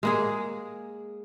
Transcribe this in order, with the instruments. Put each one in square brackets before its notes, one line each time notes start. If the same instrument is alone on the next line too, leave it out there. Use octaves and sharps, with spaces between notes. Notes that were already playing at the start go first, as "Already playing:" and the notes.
[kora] G#3 A#3 G#4